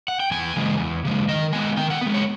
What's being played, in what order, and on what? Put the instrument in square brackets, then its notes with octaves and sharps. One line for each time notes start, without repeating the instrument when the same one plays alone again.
[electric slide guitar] F#5
G5
E2 G#5
C#3 E3 G#3
E2
C#3 E3 G#3
D#3 D#5
G#3 B3 G#5
D#3 G5
F#5
G#3 B3
C#5